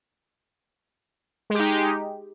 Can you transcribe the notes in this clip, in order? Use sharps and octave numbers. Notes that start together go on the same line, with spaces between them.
G#3 D#4 G4